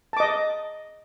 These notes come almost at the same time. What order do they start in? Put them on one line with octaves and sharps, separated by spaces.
A5 D6 D#5